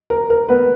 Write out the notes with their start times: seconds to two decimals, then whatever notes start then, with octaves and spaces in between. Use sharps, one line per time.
0.10 A#4
0.30 A#4
0.49 B3 B4